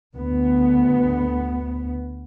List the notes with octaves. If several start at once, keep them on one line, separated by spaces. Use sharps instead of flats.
D2 B3